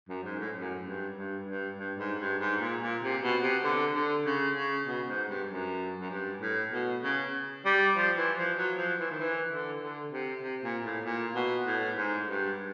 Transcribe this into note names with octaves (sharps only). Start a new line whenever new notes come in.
F#2
G#2
A2
F#2
G2
G2
G2
G2
G#2
G2
G#2
A#2
A#2
C3
B2
C3
D3
D3
C#3
C#3
B2
G#2
G2
F#2
F#2
G2
A2
B2
C#3
G3
F3
E3
F3
F#3
F3
E3
D#3
E3
D3
D3
C3
C3
A#2
A2
A#2
B2
A2
G#2
G2